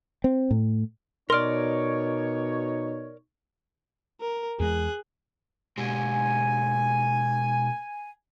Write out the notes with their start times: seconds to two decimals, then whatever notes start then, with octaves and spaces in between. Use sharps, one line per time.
0.24 C4
0.51 A2
1.30 B2 D#4 A#4 C#5 D5 C6 F6
4.20 A#4
4.60 E2 G#3 G#4 F#6
5.78 B2 G#3 G4 G#5